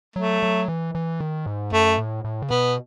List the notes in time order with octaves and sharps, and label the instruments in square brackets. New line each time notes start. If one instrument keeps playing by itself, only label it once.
[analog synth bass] F#3 [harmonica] A3
[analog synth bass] F#3
E3
E3
D#3
G#2
[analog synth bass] F#2 [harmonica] A3
[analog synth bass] A2
A2
C#3
[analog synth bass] B2 [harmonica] B3